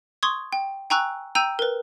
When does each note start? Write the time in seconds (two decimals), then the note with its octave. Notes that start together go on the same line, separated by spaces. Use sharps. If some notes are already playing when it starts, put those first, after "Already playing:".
0.23 C6 C#6 D#6 G#6
0.53 G5
0.90 G5 G#5 A#5 C#6 E6 F#6
1.35 G5 A#5 E6 G6 D#7
1.59 A#4 B4